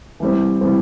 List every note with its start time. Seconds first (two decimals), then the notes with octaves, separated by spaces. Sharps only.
0.20 E3 G3 C4
0.61 E3 G3 C4